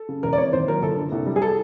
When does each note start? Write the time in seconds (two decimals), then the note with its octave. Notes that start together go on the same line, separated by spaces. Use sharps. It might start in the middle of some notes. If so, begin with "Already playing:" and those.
Already playing: A4
0.09 C#3
0.23 E1 A#4
0.33 D5
0.38 C3 C#5
0.53 D#2 C5
0.68 F#3 A#4
0.82 G1 A4
0.97 D3
1.12 C2
1.26 G3
1.36 G#4
1.42 A4